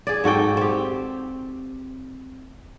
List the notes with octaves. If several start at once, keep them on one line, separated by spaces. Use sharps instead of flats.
G#4 D5
G#2 F#4 A4 G5
C4 G4